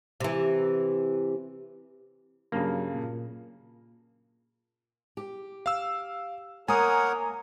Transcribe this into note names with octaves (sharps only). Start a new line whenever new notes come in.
C3 E3
G2 C#3 F#3 A#3
A#2
G4
F5 E6
A#3 A#4 C#5 F#5 G#5 A#5 D#6